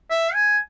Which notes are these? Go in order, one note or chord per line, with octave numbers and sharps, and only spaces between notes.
E5
G#5